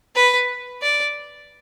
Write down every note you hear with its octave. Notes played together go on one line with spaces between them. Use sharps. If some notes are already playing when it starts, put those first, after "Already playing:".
B4
D5